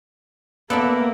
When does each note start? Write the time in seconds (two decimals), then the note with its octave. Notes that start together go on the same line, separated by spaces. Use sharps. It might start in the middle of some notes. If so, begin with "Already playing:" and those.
0.70 A#3 B3 A4 B4 D5 E5